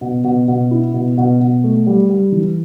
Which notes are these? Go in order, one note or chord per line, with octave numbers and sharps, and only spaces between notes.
B2
B2
B2
E4
B2
B2
B2
A3
G3
G3
E3